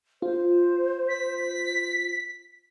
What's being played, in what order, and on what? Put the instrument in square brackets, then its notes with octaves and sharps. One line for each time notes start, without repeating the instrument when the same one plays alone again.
[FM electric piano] F4 [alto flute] C5
[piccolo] B6